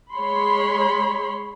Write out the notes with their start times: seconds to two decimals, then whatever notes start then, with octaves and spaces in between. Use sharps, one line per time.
0.13 G#3 C#5 B5 C6